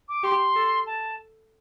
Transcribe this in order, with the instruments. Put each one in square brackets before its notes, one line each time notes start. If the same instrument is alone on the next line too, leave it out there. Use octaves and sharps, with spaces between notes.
[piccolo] D6
[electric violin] G4 [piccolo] C6
[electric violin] A4
[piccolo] A5